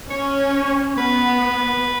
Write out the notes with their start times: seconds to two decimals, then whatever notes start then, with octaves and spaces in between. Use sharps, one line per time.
0.10 C#4 C#5
0.97 B3 B4